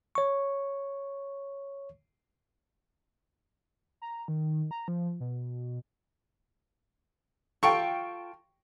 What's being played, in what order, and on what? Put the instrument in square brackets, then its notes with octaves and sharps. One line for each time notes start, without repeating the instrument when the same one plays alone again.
[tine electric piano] C#5 C#6
[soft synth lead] A#5
D#3
A#5
F3
B2
[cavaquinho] F4 A4 [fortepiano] G5 C#6